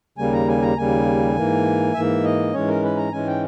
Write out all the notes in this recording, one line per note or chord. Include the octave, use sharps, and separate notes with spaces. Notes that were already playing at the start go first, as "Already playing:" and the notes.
D#2 C#3 G3 A#3 G#5
A#5
G#5
A#5
D#2 C#3 G3 A#3 G#5
G#2 E3 A#3
G#2 E3 A#3 E5
D#5
G#2 E3 G#3 C#4 C#5
A#4
B4
A#5
G#2 E3 G#3 C#4 G#5
G5